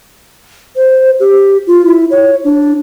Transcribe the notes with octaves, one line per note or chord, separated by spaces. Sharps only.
C5
G4
F4
E4
C#5
D4